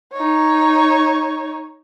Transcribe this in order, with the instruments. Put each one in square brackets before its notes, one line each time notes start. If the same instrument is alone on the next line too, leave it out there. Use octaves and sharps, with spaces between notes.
[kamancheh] D#4 C#5